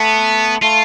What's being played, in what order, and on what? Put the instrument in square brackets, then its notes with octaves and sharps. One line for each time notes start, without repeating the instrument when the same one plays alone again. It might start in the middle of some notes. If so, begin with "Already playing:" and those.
Already playing: [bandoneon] A3 [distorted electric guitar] B3
[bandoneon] A3 [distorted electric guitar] F4